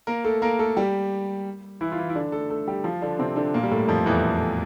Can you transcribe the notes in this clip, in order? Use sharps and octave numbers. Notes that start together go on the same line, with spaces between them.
A#3 A#4
A3 A4
A#3 A#4
A3 A4
G3 G4
E3 E4
F4
E3 E4
E4
D3 D4
A3 A4
A3 A4
G3 G4
F3 F4
D3 D4
C3 C4
D3 D4
A#2 A#3
G3
A2 A3
F2 F3
E2 E3